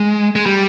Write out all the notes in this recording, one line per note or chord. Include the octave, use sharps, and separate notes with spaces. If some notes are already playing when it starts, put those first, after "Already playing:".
Already playing: G#3
G#3
G3